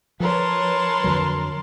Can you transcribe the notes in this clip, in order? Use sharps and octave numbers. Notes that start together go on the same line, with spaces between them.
F3 A#4 B4 C#5 A5 C6
F2 D3 F#3